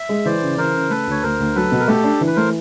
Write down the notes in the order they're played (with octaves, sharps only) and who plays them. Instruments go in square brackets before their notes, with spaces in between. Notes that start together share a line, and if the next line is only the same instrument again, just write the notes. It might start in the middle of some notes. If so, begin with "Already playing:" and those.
Already playing: [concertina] E5
[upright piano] G#3
[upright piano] E3 [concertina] C5 D5
[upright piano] C#3
[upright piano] E3 [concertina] A#4 C5
[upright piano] C#3
[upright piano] A3 [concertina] A4 B4
[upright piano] D2 [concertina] C#5
[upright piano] D2 [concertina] A#4 C5
[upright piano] D2
[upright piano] F#3 [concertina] A4 B4
[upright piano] B2
[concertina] A#4
[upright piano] A3 [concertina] G4 A4
[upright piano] D4
E3
[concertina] B4
[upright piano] A3 [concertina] A#4 C5